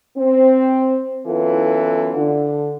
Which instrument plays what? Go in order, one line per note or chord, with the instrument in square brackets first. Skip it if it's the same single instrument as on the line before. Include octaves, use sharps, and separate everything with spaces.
[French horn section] C4
F#2 E3 B3 E4 F4 A4
D3